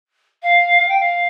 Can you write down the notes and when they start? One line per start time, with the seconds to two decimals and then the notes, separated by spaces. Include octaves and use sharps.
0.42 F5
0.88 G5
0.99 F5